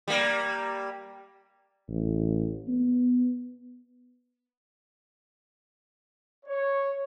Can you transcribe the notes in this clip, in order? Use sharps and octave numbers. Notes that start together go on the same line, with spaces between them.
G3 A#3
A1
B3
C#5